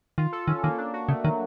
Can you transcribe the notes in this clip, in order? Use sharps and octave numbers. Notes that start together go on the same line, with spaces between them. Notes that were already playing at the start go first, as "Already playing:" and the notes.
D#3 F4
A4
D#3 C#4
D#3 A#3
D4
F#4
C#3 A3
D#3 F#3